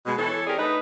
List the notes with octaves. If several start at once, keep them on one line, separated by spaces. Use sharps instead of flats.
B2 G#3
E3 A4 C#5
C4 G4 G#4 A#4 C#5 D5
D3 A3 D#4 B4